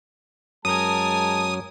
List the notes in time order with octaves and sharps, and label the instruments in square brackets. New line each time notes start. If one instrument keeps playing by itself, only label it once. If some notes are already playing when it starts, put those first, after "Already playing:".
[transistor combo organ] F#2 F#3 C#4 [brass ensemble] G#3 A5 [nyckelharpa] A#4 G#5 [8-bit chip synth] D#6